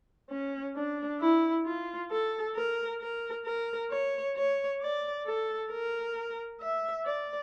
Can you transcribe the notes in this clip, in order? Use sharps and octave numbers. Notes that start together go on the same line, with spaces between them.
C#4
D4
E4
F4
A4
A#4
A#4
A#4
C#5
C#5
D5
A4
A#4
E5
D5